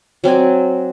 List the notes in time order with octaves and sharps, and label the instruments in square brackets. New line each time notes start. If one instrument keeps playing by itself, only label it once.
[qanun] F#3 C4 D5 G#5